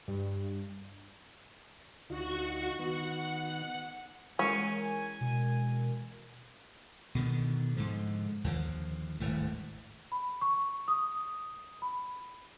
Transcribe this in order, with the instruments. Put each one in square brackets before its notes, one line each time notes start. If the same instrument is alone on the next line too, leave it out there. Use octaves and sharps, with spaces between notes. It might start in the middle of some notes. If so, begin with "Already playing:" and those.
[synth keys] G2
[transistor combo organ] D2 D#4 F4 [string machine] F#4 C#6
[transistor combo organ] D#3 B3 [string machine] F#5
[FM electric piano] E3 G#3 A#4 [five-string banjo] C#4 [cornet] G#5
[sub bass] B2
[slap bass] B2 D3 D#3 B3
G#2 D3 F3
D#2 D3 F3
D#1 G#1 A2 A3
[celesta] B5
C#6
D#6
B5